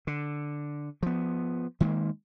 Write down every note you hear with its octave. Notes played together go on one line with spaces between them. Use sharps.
D3
F3 B3
D#3 G#3 A#3